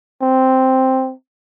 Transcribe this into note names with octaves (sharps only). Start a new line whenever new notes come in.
C4